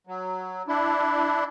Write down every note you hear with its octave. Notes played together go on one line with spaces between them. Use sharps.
F#3
D4 E4